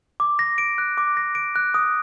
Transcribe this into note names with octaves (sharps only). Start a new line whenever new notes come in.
D6
A#6
D7
F#6
D6
A#6
D7
F#6
D#6